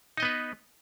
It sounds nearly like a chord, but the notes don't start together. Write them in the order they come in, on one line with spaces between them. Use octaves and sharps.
D#4 D#5 B3 B4